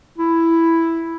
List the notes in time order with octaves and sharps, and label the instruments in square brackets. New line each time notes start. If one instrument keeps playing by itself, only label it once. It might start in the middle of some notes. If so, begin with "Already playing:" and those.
[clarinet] E4